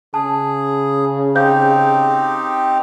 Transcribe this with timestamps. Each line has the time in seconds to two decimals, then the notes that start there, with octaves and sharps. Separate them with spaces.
0.14 C#3 G#4 A5
1.35 C4 D#4 G4 C5 F5 G6